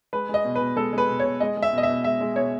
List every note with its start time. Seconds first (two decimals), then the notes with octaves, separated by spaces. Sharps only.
0.13 G#3 B4
0.29 G#3 D#5
0.45 B2
0.55 B4
0.61 B2
0.76 G#3 A4
0.93 G#3 B4
1.09 B2
1.20 B2 C#5
1.40 G#3 D#5
1.57 G#3
1.62 E5
1.73 B2 D#5
1.83 E5
1.88 B2
2.04 G#3 E5
2.21 G#3
2.36 B2 C#5